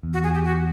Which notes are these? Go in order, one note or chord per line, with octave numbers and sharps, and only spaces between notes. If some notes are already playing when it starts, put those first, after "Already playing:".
E2
F#4
G#4
G4
F#4